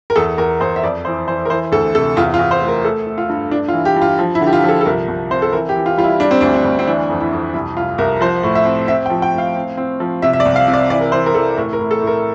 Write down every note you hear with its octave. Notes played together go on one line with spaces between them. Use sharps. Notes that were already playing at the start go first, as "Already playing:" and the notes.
A#4
E2 A4
E2 A#4
E2 C5
E5
F2 D5
E3 C5
E3 C5
A#4
E3 C5
D2 A4
C3 A4
E2 F4
F4
E2
C5
A3
A#4
A3 A4
A3
F4
G2
G2 D4
F4
E3
G4
G2
F4
F3
E4
D3
G4
F4
F3 A4
A4
C2 A#4
C2
C4 C5
A4
E3 A#4
G4
E3
F4
G3 F4
E4
G3 D4
C4
D2 D4
D4
D2
C4
E3 D4
F2
E4
F2
C2 E4
C2 F4
C2 A#4
F3 C5
A2
E5
C4
C4 E5
G5
F3
G5
A2
F5
C4
C4
F3
C3 E5
E5
D5
C2
F5
C3
D5
E3 D5
A#4
E3 C5
A#4
E3 A4
A2 A#4
A#4
A2
A4
A2
A#4